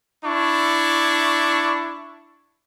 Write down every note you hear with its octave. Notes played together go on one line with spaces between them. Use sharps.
D4 E4 C#6